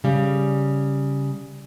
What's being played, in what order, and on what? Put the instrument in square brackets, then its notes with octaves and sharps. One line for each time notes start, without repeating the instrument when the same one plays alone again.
[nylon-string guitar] C#3 G3